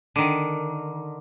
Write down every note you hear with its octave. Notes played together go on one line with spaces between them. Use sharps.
D3 D#3